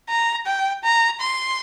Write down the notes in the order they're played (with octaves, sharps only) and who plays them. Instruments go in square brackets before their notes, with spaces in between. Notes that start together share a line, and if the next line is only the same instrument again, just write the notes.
[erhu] A#5
G5
A#5
C6